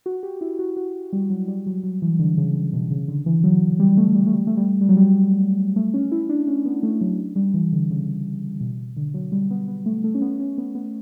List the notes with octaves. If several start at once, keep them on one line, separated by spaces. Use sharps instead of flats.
F#4
G4
E4
F#4
F#4
G3
F#3
G3
F#3
F#3
E3
D3
C#3
C#3
B2
C#3
D3
E3
F#3
G3
A3
G3
A3
G3
A3
G3
G3
F#3
G3
A3
C#4
E4
D4
C#4
B3
A3
F#3
G3
E3
D3
C#3
B2
D3
F#3
G3
B3
B3
A3
A3
C#4
B3
C#4
B3
B3